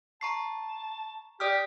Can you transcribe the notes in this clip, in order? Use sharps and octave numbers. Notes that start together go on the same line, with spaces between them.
A5 A#5 C#6 C7
G4 D5 D#6 F6